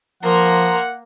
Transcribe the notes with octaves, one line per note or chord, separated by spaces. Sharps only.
F3 A#3 A#4 F#5 A#5 C6